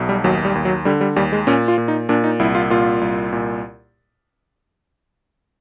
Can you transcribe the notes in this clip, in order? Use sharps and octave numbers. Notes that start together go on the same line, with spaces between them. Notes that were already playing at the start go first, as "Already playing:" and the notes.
Already playing: B1 B2
G3
D#2 F#3
G3
D#2
F#3
D3 G3
G3
D#2 G3
G#3
A#2 C#4
F4
A#2
D#4
A#2 D4
D#4
C2 E4
F4
A#2 F4
C2
A#2